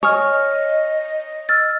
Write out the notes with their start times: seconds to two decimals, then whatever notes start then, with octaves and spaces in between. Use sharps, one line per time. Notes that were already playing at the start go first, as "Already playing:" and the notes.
0.03 C#5 D#5 G#5 D#6 F6
1.49 E6 F6 A6